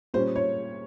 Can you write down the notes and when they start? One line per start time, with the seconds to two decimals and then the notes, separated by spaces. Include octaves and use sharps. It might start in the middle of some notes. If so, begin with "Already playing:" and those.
0.14 A#2 G3 C#4 C5
0.36 C#5